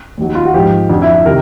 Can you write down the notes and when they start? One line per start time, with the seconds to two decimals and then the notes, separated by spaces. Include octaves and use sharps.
0.17 D#2 D#3 F#3
0.35 F4
0.45 F#4
0.54 G#2 F3 G4
0.89 F2 D3 F#3
1.02 E4
1.13 E4
1.26 C3 D#3 A#4